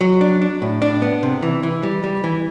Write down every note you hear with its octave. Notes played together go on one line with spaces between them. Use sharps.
F#3
D4
D4
A2
D4
B3
C3
E3
E3
G3
G3
E3